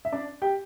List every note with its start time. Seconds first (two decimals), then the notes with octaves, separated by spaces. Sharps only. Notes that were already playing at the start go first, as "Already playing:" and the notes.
0.05 E5
0.12 D4 D5
0.42 G4 G5